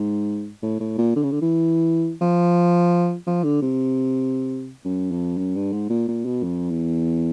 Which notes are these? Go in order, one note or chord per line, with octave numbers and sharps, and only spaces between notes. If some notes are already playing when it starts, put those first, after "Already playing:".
Already playing: G#2
A2
A2
A#2
D3
C#3
D3
E3
F3
F3
D3
C3
F#2
F2
F#2
G2
G#2
A#2
A#2
B2
F2
E2